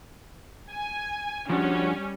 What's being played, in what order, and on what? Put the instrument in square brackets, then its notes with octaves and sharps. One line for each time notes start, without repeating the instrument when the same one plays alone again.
[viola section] G#5
[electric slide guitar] F3 D4 F#4 [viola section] G3 C#4